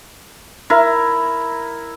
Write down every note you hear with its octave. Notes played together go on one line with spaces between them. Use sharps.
E4 A#4